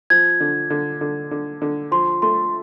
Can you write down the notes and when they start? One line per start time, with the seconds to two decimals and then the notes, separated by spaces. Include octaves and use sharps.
0.10 F3 G#6
0.40 D3
0.70 D3
1.01 D3
1.31 D3
1.62 D3
1.91 F3 C6
2.22 A3 C6